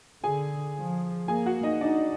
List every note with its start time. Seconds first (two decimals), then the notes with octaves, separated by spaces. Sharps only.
0.23 D3 G#4 G#5
0.76 F3
1.28 A#3 G#4 G#5
1.46 F#4 F#5
1.63 D#4 D#5
1.81 D4 D#4 D5